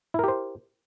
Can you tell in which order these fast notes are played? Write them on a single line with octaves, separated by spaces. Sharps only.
E4 A#4 G4 C5